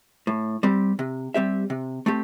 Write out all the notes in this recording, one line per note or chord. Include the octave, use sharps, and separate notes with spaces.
A2
G3 C4 G4
C3
G3 C4 G4 E5
C3
A3 C4 G4